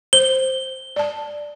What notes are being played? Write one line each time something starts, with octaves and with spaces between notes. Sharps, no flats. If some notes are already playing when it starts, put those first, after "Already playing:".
C5 G7
D5 A5